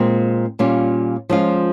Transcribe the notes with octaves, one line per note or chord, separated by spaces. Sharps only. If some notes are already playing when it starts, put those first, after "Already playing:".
Already playing: A#2 G#3 C4
A#2 G3 C#4 F4
F3 G#3 C#4 F4